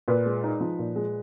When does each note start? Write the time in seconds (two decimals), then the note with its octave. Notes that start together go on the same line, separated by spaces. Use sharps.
0.08 A#2 B4
0.26 G#3
0.44 D#4
0.60 F3
0.79 A#2
0.96 G#3